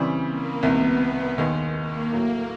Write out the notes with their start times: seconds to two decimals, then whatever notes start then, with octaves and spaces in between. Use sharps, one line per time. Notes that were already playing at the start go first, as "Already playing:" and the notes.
Already playing: C#3 E3 G3 C4
0.26 A#3
0.63 C2 C3 D#3 B3
1.38 D#2 D#3 G#3
1.75 A#3
2.12 A2 F#3 A3 A#3